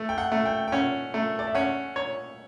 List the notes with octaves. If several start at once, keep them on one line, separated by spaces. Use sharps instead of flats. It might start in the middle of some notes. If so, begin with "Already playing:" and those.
Already playing: A3
G5
F#5
A3
G5
G5
C#4 F#5
A3
D5
E5
C#4 F#5
C#5